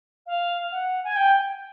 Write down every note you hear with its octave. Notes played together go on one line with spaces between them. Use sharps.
F5
F#5
G#5
G5